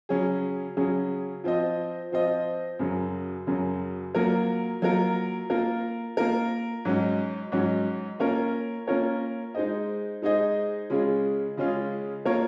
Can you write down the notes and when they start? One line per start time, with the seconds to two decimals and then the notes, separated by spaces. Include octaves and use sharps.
0.09 C#3 F#3 C#4 G#4
0.77 C#3 F#3 C#4 G#4
1.44 F3 C4 F4 C5 D#5
2.12 F3 C4 F4 C5 D#5
2.79 F#2 C#3 F#3
3.47 F#2 C#3 F#3
4.15 F#3 A#3 F4 A#4
4.82 F#3 A#3 F4 A#4
5.50 A#3 F4 A#4
6.17 A#3 F4 A#4
6.85 G#2 F#3 C#4 F#4
7.52 G#2 F#3 C#4 F#4
8.19 A#3 C#4 F4 A#4 C#5
8.87 A#3 C#4 F4 A#4 C#5
9.55 G#3 D#4 G#4 C5 D#5
10.22 G#3 D#4 G#4 C5 D#5
10.90 C#3 G#3 C#4 F4 G#4
11.57 C#3 G#3 C#4 F4 G#4
12.25 A#3 F4 A#4 C#5